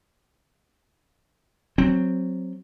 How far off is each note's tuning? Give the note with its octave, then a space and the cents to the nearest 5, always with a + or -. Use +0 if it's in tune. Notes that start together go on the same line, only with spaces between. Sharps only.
F#3 +0 C4 +0